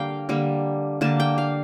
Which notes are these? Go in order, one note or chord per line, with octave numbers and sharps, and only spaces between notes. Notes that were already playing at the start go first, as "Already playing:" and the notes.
Already playing: D3 G3 A#3 F5 G5
D3 G3 A#3
D3 G3 A#3 A5
G5
F5